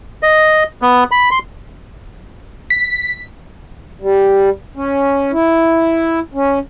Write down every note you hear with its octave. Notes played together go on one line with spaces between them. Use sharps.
D#5
B3
B5
C6
B6
G3
C#4
E4
C#4